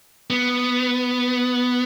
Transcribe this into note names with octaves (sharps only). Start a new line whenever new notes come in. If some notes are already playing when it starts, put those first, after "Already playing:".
B3